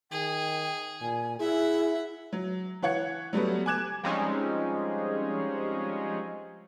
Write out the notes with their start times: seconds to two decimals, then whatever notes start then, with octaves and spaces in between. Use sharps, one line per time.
0.12 D#3 G#4 G5
1.01 A#2 G#5
1.39 E4 G#4 E5 F#5
2.33 F#3
2.82 E3 C#5 F#5 G#6 C#7
3.33 F#3 G3 A3 B3
3.66 G#5 D6 F#6 G#6 E7
4.04 F3 G3 G#3 C4 C#4 D#4